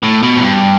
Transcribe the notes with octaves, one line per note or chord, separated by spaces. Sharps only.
A2
B2
A2
G2